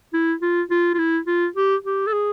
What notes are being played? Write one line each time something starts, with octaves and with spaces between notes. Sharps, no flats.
E4
F4
F4
F4
E4
F4
G4
G4
A4
G#4